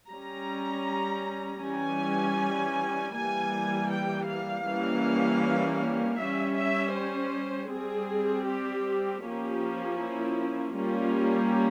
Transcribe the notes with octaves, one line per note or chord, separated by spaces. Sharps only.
G3 C#4 A#5
E3 G3 C#4 G#5
E3 G3 A#3 G#5
G5
F5
E3 G3 A#3 C#4
G3 C#4 E5
E5
C5
G3 C4 G#4
G4
F3 A#3 C#4 G4
E4
G3 A#3 C#4 F4